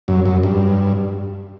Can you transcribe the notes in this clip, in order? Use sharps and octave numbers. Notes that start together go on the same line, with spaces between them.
F#2
F#2
G2